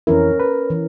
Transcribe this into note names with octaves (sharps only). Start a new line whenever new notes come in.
F2 E3 C#4 E4 A#4
B4
E3